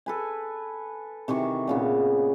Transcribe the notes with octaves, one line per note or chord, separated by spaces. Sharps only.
A4 B4 G#5
C3 D#3 E3 C#6
A#2 C#3 B3